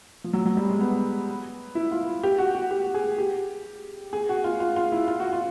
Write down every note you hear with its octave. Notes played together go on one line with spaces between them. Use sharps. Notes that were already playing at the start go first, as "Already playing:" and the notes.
F3
F#3
F#3
G3
G#3
B3
E4
F4
G4
F#4
F#4
G4
G#4
G4
G#4
F#4
F4
F4
F4
E4
F4
F#4
F4